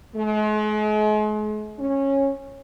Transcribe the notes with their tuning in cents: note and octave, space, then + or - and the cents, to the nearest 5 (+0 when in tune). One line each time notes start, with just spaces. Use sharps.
G#3 +40
C#4 -15